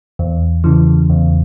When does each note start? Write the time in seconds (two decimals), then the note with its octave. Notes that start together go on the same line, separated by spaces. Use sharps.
0.19 E2
0.64 C#3 E3
1.10 E2